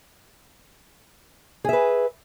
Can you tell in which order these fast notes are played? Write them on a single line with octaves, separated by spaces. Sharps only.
G#4 E5 B4